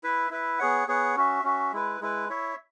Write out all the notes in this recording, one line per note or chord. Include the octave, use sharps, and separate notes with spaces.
E4 B4 E5
E4 B4 E5
B3 G#4 C#5 F#5
B3 G#4 C#5 F#5
C#4 F#4 E5
C#4 F#4 E5
G#3 E4 B4
G#3 E4 B4
E4 C#5 E5